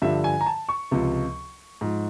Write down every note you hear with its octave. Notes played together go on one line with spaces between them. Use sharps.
G2 D3 F3 E5
G#5
A#5
A5
C#6
C#2 C3 F3
G#2 F3